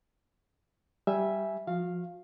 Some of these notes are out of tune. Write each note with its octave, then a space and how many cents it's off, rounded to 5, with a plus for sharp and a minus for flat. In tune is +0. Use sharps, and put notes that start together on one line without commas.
G3 -5 E5 +0 G#5 +0
F3 +0 F#4 -40 F5 +0